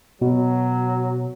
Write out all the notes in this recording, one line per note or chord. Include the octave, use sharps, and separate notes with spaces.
B2 F#3